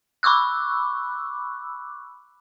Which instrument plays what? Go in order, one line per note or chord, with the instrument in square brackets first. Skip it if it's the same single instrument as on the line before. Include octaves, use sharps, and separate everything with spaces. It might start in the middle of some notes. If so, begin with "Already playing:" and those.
[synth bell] B5 C#6 D6 E6 F#6